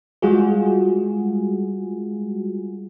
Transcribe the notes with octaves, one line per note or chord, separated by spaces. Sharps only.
G3 G#3 F4 F#4 G#4